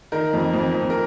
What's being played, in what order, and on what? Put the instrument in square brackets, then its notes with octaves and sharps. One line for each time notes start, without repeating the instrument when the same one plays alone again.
[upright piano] D#3 A#4
F2
F2
F2
A#4